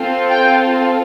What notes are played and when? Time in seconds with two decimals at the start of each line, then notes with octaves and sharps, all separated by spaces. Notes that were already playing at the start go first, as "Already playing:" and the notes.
Already playing: C4 F4 A4
0.31 G5